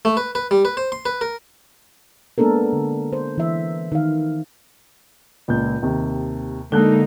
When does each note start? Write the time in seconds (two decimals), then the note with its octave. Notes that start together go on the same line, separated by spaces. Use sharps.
0.05 A3
0.17 B4
0.35 B4
0.51 G3
0.65 B4
0.77 C5
0.92 C6
1.06 B4
1.21 A#4
2.38 G#3 A#3 B3 D4 A4 A#4
2.73 D3
3.12 C5
3.38 E3 E5
3.92 D#3 F5
5.48 C#2 A#2 G6
5.83 D#2 C3
6.72 D3 G#3 A#3 D#4 A4 F#6 G7